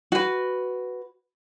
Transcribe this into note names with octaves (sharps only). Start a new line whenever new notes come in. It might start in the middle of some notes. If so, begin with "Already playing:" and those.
F#4 B4